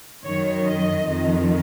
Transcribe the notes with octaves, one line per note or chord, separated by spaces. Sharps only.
F#2 D#3 C#5
D#5
F2 D#3